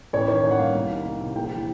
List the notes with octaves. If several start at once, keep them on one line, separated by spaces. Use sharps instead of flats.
A1 C#5
D#3 C#5
A1
F#5
G2 F5
C2
D#3
C2
C3
A#1 G5
E3